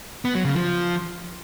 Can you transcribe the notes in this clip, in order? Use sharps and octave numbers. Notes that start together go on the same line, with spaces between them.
B3
F#3
C#3
F3